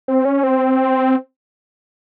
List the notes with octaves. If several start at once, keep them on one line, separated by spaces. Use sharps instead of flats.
C4
C#4
C4